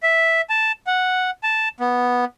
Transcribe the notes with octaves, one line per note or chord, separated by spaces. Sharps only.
E5
A5
F#5
A5
B3